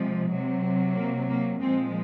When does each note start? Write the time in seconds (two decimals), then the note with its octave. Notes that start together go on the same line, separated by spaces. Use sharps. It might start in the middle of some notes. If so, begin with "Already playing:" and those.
Already playing: C3 F3 G#3
0.30 C3 F#3
0.95 A#3
1.29 A#3
1.61 A#2 F3 G#3 C4